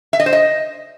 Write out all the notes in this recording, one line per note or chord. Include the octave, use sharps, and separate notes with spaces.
E5
D#5
C5
D#5